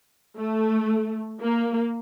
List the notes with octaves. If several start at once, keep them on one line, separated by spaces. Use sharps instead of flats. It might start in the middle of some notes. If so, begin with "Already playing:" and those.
A3
A#3